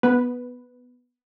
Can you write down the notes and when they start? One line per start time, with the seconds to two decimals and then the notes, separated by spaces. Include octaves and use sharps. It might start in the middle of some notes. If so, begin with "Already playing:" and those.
0.03 B3 B4